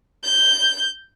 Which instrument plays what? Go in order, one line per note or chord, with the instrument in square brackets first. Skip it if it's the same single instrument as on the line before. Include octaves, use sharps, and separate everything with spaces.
[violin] G6